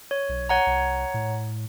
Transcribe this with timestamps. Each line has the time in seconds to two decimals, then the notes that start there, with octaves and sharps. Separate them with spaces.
0.11 C#5
0.29 B1
0.49 C#5 F#5 A#5
0.66 C2
1.14 A2